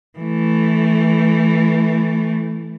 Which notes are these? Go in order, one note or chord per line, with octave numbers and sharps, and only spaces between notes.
E3 A3